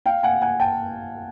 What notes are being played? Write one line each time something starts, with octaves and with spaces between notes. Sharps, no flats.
F5 G5
F#5 G#5
F#5 G#5
G5 A5